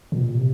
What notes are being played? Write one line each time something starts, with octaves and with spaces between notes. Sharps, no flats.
A#2
C3